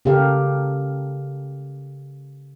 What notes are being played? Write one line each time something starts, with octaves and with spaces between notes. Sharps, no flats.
C#3 G4 A4 A#4 F5